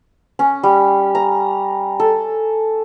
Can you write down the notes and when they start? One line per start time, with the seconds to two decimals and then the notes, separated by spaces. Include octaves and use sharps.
0.39 C#4
0.63 G3
1.15 A#5
2.00 A4